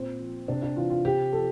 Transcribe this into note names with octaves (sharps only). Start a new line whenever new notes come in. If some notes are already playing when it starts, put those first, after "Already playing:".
Already playing: A#2 C4
F3
C3 D4
D4
E3 F4
F4
C3 G4
F3 A4